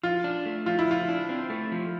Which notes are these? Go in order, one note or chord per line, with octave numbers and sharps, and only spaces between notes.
F3 F4
D4
A3
F3 F4
E4
F3 F4
D4
C4
A3
F3